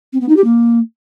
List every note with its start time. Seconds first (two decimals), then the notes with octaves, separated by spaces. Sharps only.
0.13 C4
0.21 B3
0.29 D#4
0.37 G4
0.44 A#3